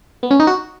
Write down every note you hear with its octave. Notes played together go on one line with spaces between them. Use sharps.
B3
C#4
D#4
F#4